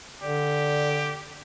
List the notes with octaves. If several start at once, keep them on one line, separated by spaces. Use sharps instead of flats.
D3 G4 D5